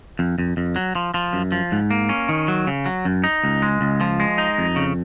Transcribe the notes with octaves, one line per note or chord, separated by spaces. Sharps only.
F2
F2
F2
F#3
F3
F3
F#2
F3
G#2
A#3
C#4
D#3
F#3
C#3
F#3
F#2
D#4
C#2
G#3
C#2
F3
G#3
D#4
F2
C#3